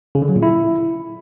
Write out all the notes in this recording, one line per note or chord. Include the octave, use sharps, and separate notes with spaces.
C#3
D3
F#3
A#2
E4